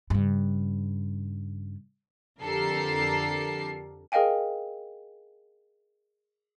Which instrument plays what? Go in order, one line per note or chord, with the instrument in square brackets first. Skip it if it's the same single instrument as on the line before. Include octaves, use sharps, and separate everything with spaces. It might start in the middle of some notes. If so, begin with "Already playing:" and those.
[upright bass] G2 C#3
[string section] F2 D3 G4 A4 A#4 C7
[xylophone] G#4 A#4 D#5 F5 G5 G#5